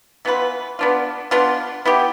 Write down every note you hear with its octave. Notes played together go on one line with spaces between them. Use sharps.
E3 B3 F4 B4
B3 D4 F4
B3 D4 F4
B3 E4 G4